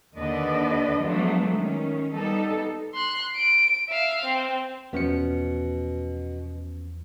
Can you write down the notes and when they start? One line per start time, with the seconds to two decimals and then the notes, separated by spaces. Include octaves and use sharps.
0.18 D#2 D3 B4 D5 D#5
1.03 F3 F#3 G#3 A3 B3 D4
1.53 D#3 C#4
2.14 G3 B3 D#4 A4
2.94 C6 F#6
3.36 D7
3.89 E5 F5
4.24 C4
4.93 E2 B2 F3 B3 C#4 C#7